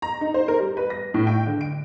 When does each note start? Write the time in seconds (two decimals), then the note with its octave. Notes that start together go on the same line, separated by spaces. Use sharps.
0.02 A#5
0.21 D#4
0.34 C5
0.48 A#4
0.60 G3
0.77 B4
0.90 A#6
1.14 A2
1.27 G5
1.46 D3
1.61 D7